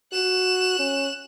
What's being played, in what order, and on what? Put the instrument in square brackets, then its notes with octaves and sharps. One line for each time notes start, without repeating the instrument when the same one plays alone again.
[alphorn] F#4 [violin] F#6 E7
[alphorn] C#4